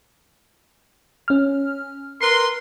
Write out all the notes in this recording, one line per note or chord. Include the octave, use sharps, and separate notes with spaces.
C#4 F6
A#4 B4 C6 C7